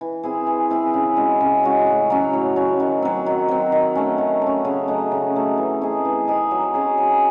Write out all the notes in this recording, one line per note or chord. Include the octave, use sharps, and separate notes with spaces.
E3
C4 E4 G#4
E3
C4 E4 G#4
C#3
G#3 C#4 F#4
C#3
G#3 C#4 F#4
A2
F#3 C#4
A2
F#3 C#4
D#3
F#3 C4
D#3
F#3 C4
D#3
A3 C#4
D#3
A3
C#4
C#3
F#3 A3 D#4
C#3
F#3 A3 D#4
E3
C4 D#4 G#4
E3
C4 D#4 G#4
F#3
C#4 G#4
F#3